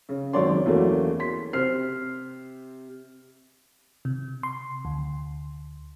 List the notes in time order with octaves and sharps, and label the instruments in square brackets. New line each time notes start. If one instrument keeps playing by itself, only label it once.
[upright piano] C#3
G#1 F#2 C#5 D5 C6
E2 F#3 A3 A#3 C#4
C6 B6
C3 C5 F6 C7
[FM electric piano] C3
C6
D2